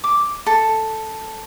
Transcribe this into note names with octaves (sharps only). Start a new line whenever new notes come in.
D6
A4